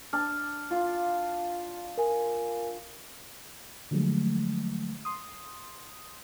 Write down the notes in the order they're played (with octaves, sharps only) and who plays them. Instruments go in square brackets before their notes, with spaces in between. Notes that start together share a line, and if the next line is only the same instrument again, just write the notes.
[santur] D4 [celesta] F6
[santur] F4
[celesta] A#4 G#5
[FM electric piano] D3 F3 F#3 G#3 A3
C6 D#6